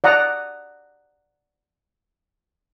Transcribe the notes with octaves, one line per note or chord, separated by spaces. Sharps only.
D5 F#5 A#5 D#6